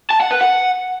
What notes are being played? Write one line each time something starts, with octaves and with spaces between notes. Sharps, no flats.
A5
F#5
B4
F#5